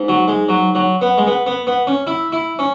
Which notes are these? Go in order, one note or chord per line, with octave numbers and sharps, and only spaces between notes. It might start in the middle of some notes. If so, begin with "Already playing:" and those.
Already playing: G#2
F#3
G#3
F#3
F#3
B3
G#3
B3
B3
B3
C#4
E4
E4
C#4